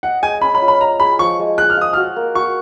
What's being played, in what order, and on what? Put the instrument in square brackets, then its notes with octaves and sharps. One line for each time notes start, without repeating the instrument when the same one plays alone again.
[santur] D#5 [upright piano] F#5
[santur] G#3 [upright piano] G#5
[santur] C#4 [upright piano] B5
[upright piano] B5
[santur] F4
[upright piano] B5
[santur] D#5 [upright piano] A#5
[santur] G#4 [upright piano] B5
[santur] F3 [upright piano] C#6
[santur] G#3
[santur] G#4 [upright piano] F#6
[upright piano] F6
[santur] F4 [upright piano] D#6
[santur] F#4 [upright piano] F6
[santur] A#3
[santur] F#4 [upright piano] C#6